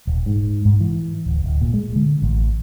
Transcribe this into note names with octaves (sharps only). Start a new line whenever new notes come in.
D#1
G#2
G#2
E3
D1
D1
A#2
G#3
D3
A1